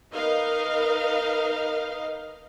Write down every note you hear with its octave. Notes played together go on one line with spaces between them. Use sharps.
D#4 A#4 B4 D#5 F5